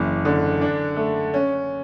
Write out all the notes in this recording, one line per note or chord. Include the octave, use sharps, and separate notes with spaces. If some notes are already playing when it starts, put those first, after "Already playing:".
Already playing: F#1 E3
D3
D4
A3
C#4